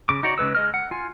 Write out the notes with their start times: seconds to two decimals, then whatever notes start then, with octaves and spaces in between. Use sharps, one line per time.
0.09 C#3 D6
0.23 D#4 F#4 C#5 D5
0.38 C#3 G#3 B4 E6
0.55 G#3 D#5 F6
0.74 F#5
0.91 F4 G#5